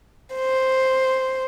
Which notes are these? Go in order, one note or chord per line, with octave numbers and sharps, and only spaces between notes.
C5